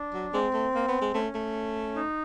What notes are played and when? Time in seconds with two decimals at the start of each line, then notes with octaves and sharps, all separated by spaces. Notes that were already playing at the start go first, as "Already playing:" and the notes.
Already playing: D4
0.13 F#3
0.33 G#3 C4
0.54 A3
0.75 A#3
0.88 B3
1.01 G#3
1.14 A3 C#4
1.35 A3
1.96 D#4